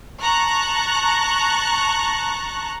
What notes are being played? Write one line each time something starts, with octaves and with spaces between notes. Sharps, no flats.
A5 A#5 C#6 F#6